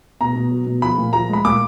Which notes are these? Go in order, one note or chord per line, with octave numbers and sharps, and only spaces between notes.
B2 A#5
B2
F#3
B2
F3 B5
A#2
F3 A#5
G#3 B5
A#2 D6